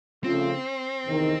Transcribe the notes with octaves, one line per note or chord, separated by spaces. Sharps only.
C#3 F3 A3 C4 C#4 F4
E2 C3 D#3